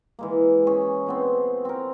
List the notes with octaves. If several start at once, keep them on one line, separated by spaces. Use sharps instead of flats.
E3 G#3 A#3
C#4 G#4 C#5
A#2 B3 C4
C4 A#4